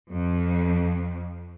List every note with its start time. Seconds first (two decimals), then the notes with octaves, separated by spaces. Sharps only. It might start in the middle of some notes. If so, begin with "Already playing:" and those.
0.11 F2